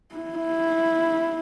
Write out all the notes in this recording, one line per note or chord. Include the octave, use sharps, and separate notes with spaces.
E4